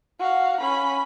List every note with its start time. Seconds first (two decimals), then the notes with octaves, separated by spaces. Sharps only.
0.19 F#4 F5
0.60 C#4 B5